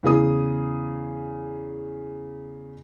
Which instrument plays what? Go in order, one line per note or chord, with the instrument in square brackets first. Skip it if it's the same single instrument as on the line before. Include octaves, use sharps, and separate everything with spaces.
[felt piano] E2 C#3 G#4 D#6